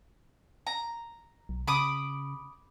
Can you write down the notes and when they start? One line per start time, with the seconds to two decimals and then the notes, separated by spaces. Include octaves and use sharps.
0.67 A#5
1.49 B1
1.67 C#3 B5 D6 D#6